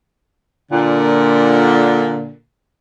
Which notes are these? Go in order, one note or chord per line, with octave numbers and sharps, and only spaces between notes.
A#2 D3